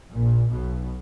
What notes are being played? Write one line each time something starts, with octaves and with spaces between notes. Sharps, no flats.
A#1 A#2
B1 B2